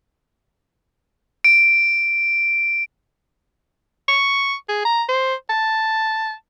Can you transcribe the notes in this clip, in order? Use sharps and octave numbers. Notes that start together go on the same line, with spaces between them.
D7
C#6
G#4
A#5
C5
A5